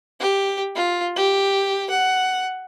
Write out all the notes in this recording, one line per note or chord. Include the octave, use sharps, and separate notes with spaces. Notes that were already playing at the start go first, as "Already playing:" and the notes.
G4
F4
G4
F#5